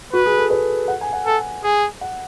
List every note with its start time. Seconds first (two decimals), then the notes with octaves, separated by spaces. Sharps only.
0.13 F#4 B4
0.26 G#4
0.38 A4
0.50 B4
0.88 F#5
1.01 G#5
1.13 F#5
1.26 A4 G#5
1.64 G#4
2.01 F#5